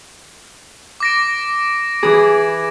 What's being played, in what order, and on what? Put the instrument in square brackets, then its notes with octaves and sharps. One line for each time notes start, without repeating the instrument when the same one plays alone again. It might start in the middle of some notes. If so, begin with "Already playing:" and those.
[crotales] D6 A#6 D7
[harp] E3 G#4